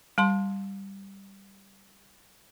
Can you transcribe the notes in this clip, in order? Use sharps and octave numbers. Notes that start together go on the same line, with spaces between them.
G3 A5 C6